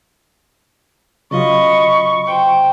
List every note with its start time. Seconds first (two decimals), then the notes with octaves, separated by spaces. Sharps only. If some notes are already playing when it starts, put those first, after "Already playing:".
1.31 C#3 F#3 F4 D#5 B5 C#6
2.27 C5 G5